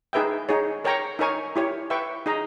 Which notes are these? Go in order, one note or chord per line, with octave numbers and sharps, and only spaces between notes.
D#4 G#4 B4 E5 G5
D#4 G#4 C#5
A#4 C#5 G5 A#5 C#6
D#4 A#4 C#5 G#5 C#6
E4 G4 C#5
B4 E5 G5 C#6
D#4 G#4 D#5 A#5